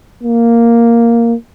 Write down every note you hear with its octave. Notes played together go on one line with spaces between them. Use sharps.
A#3